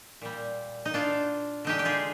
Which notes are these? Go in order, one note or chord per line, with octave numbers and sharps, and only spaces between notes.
A#2 G3
D#4
D4 F4
D3 G#3 D#4 G4
G4
F4 G#4